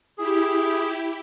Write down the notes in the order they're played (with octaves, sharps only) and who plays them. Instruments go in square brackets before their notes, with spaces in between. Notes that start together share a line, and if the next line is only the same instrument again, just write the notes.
[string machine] E4 G4 [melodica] G#4